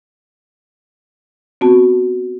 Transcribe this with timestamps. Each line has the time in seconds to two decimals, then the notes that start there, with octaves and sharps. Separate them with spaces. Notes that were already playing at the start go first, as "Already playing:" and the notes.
1.61 B3 C4 F#4 A5